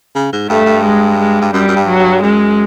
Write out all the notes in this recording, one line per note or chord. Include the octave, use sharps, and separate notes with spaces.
C#3
G#2
G2 A3
G2
G#3
G#3
G2
F#2 G3
F#2
G2
F#3
G2
F#2 G#3